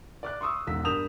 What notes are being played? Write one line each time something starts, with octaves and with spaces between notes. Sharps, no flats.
D5 D6 F#6
C6 C#6 D#6 E6
E1 G#2 E6 B6
G2 A#4 D#6 G6 E7 F7